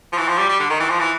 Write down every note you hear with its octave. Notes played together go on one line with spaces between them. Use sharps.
F3
E3
F3
G3
G3
D3
D#3
E3
F3
E3